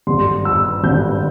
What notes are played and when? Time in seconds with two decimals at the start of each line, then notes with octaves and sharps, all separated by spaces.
0.07 G#1 G2 D3 C6
0.45 E6
0.84 G#1 G2 D3 G6